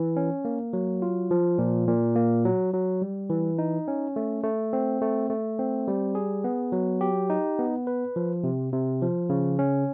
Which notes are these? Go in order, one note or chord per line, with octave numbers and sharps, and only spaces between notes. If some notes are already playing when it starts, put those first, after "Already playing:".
Already playing: E3
C#4
A#3
F#3
F4
F3
A#2
A#2
A#3
F#3
F#3
G3
E3
D#4
C#4
A3
A3
C4
A3
A3
C4
G3
G#4
B3
F#3
G4
D#4
B3
B4
F3
C3
C3
F3
C#3
C#4